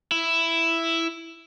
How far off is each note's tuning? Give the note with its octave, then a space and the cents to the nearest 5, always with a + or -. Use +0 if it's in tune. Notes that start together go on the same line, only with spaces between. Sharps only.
E4 +5